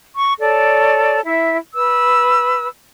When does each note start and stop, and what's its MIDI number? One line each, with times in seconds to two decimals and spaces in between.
0.15 0.34 85
0.39 1.20 69
0.39 1.20 73
0.39 1.20 74
1.25 1.57 64
1.25 1.57 76
1.75 2.67 71
1.75 2.67 88